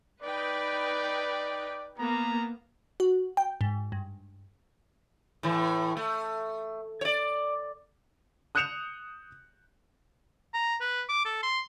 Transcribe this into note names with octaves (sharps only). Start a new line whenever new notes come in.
D#4 B4 D5 G5
A#3 B3 A#5
F#4
G5
G#2
G2
A2 E3
A3
C#5 D5
D#6 F#6 G6 C#7 E7 F7
A#5
B4
D6
A4
C6